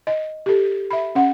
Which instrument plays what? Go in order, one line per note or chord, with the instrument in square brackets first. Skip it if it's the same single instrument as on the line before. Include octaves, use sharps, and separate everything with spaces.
[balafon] D#5
G4 A4
E5 B5
C#4 F#5